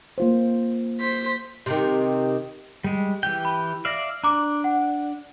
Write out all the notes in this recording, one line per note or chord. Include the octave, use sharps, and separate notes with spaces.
A#3 F4 C5
C5 B6
C3 D#3
G3 G#3
E3 G4 G5
B5
D5 E5 F5 A#6 F#7
D4 A#5 D6
F#5